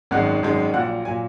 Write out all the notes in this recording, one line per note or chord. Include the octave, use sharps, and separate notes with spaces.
G#1 F#2 D#3 G#3 F#5
G#1 F#2 D#3 G#3
A#1 A#2 F#3 F#5
A#2 F#3 G#5